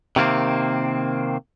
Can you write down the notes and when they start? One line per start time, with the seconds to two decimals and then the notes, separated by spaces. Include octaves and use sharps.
0.16 C3 D#3 A#3 C4